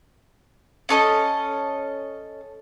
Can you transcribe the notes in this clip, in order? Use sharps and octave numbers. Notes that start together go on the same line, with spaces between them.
C#4 A4 D#5